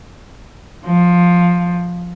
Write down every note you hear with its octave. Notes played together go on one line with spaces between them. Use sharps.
F3